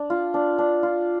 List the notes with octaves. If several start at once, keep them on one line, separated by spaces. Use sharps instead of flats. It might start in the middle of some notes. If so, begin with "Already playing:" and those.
Already playing: D4
F4
D4
D4
F4